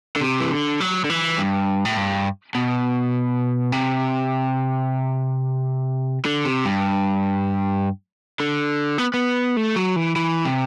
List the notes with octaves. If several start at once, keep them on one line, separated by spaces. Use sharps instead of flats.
D3
C3
E3
D3
F#3
D3
E3
G2
A2
G2
B2
C3
D3
C3
G2
D3
B3
B3
A3
F#3
E3
E3
C3